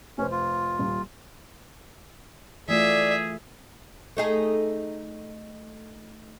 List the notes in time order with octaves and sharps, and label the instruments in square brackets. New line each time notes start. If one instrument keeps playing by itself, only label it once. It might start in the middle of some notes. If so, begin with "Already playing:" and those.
[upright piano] F1 C5 [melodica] C#4
[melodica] F4
[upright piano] D#1
[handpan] E3 A3 F4 [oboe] G#4 [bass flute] D5 [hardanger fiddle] E5
[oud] A3 D#4 G#4